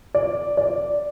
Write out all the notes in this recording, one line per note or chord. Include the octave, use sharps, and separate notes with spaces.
D5
D5